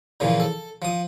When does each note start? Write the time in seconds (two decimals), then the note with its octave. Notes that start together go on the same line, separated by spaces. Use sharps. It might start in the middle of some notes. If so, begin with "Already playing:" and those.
0.20 A#2 C#3 E3 F3
0.40 A4
0.82 F3 D#6